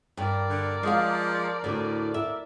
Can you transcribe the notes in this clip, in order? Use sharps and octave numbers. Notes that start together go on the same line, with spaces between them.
G2 A#4 D5
D3
F3 G#3 F5
D2 A2
E5